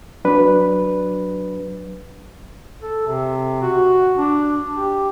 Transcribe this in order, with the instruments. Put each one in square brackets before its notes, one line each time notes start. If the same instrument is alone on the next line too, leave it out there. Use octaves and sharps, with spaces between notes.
[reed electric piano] F#3 D4 B4
[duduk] A4
C3
F#4
D4
G4